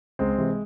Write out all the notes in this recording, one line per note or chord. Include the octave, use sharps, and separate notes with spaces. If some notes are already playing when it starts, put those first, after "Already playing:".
C#2 G#3 C4
C3 E3